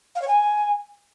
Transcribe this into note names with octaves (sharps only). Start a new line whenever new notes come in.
F5
C#5
G#5